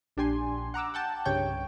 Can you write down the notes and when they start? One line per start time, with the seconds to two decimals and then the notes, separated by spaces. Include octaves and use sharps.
0.17 A#1 D4 G4 G#5 C6
0.74 F#5 A#5 D6 E6
0.94 F#5 G5 A5
1.25 C2 G2 C#3 C#5 G5